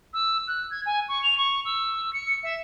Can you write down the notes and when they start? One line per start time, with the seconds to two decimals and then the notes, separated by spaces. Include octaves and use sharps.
0.14 E6
0.48 F#6
0.71 G#6
0.86 G#5
1.08 C#6
1.23 F7
1.38 C#6
1.65 E6
2.13 C#7
2.43 E5